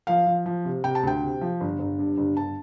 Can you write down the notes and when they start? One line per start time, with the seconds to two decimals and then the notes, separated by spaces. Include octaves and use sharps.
0.07 F3 F5
0.27 F3
0.46 F3
0.65 C3
0.84 C3 G5
0.95 A5
1.03 D2 G5
1.23 C3
1.41 F3
1.60 G1
1.79 G1
1.99 G2
2.17 G1
2.37 G1 A5